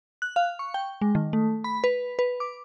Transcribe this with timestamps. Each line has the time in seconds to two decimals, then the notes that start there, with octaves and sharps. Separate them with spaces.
0.22 F#6
0.36 F5
0.59 C#6
0.74 G5
1.01 G#3
1.15 D#3
1.33 A3
1.64 B5
1.84 B4
2.19 B4
2.40 D6